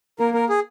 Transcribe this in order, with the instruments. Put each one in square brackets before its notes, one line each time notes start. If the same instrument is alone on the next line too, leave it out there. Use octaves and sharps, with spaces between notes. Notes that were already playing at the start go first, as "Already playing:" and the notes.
[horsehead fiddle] A#3 [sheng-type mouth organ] A#4
[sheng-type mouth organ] A#4
G#4